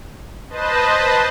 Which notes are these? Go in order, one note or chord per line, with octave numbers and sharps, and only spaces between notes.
B4 C5 D#5 A5